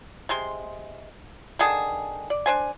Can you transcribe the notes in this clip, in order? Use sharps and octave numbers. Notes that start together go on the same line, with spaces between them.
C3 G#3 C6
D3 D#3 G#4 A5
D5
D4 C5 G#5